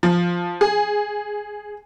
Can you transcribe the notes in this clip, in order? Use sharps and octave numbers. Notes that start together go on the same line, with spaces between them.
F3
G#4